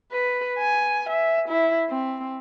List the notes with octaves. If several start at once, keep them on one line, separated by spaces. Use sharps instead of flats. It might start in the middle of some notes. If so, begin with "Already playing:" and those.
B4
G#5
E5
E4
C4